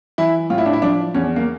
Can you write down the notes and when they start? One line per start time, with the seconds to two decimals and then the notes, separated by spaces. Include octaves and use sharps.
0.18 E3 E4
0.50 A2 F4
0.58 E4
0.66 D4
0.73 E4
0.82 F3 D4
1.14 E2 C#4
1.36 A#3